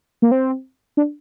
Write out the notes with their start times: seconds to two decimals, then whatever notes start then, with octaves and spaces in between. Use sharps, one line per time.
0.22 A#3
0.31 C4
0.97 D4